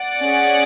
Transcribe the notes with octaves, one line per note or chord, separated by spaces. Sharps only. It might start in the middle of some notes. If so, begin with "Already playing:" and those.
Already playing: D5 F#5
C#4 G#4